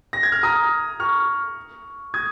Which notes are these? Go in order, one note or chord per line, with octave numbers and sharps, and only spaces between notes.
A#6
G#6
F6
A#5 D#6
C#6 F6
D#6 G#6